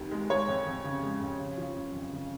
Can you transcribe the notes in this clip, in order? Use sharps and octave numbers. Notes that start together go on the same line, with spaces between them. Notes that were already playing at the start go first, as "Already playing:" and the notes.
Already playing: F1 D#2 D#3 G#3
G#3
G#3 C#5
F2
F2
C#3
G#3
F2
C#3
F3
F#1
F2
C#3